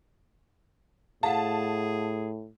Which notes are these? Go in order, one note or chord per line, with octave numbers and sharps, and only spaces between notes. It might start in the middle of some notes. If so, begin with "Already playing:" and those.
A2 G#4 F5 F#5 A5